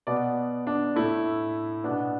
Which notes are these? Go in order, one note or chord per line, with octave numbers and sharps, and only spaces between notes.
B2 B3 D5
D4
A2 A3 E4
B2 B3 D4